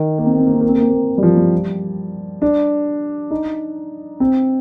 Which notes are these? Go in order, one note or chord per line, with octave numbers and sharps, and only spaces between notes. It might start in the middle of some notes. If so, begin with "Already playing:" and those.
Already playing: D#3
A#3
C4
A#3
C4
A#3
C4
A#3
C4
A#3
C4
A#3
G3
F3
G3
D4
D#4
C4